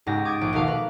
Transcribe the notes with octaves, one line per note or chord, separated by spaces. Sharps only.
C#2 G#2 G4 A#6
D6 D#6 G#6 A6 D7
A#1 D7
D#2 B2 A3 A#4 F5 D6
A#4 B4